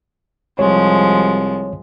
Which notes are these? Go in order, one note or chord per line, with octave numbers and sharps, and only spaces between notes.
C2 F3 G3 G#3 C#5